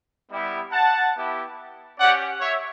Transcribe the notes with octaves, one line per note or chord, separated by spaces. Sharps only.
G3 B3 E4 G4
F#5 A5
B3 E4 G4
C#4 G4 D5 F#5
C#5 E5